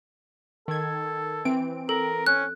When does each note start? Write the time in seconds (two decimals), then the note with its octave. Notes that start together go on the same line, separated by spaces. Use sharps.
0.68 D#3 A4 G#6
1.45 E3 C4 D7
1.89 A4 A#4
2.26 C#4 F#6